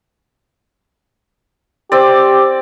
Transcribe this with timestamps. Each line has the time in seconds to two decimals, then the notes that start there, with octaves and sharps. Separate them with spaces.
1.92 C4 G4 D5